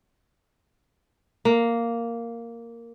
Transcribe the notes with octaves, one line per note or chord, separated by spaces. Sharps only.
A#3